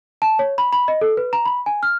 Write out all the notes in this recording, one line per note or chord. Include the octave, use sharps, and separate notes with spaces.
A5
C#5
B5
B5
D#5
A4
B4
A#5
B5
G#5
F6